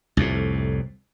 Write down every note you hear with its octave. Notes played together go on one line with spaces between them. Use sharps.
C2 F2 A2